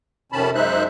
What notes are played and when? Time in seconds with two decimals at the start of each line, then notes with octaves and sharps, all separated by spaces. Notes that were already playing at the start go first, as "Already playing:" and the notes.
0.32 F2 C3 D#3 C#4 A5 B5
0.55 F#2 G#3 D#4 C5 E5 F#6